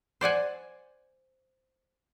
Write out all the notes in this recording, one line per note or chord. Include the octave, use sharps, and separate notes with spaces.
C5 D5 F#5 G#5